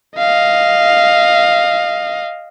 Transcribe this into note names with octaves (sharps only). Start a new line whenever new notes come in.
D#5 F5